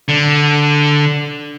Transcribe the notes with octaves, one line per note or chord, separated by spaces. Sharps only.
D3